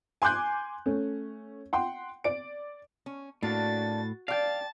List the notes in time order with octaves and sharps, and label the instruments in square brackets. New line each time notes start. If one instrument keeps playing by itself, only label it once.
[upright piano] G#5 C6 D6 F#6 G6
A3 C#4
F#5 G5 C6
D5 D7
[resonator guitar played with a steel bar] C#4
[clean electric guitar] A2 [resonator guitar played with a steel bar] A#3 D4 [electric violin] F#4 A6
[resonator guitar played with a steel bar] D5 G5 [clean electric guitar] F5 [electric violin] A5 A6